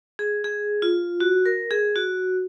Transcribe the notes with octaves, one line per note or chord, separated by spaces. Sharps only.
G#4
G#4
F4
F#4
A#4
G#4
F#4